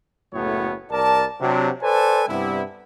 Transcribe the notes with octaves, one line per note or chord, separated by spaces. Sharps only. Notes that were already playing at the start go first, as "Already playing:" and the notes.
F#1 A2 F#3 A3 B3 C#5
C2 A#4 D5 A5
C3 F#3 D4
A4 B4 C5 D5 G#5 A5
G2 C3 G3 B3 E4